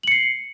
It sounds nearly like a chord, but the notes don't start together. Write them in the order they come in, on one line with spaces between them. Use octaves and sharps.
F#7 C#7 C7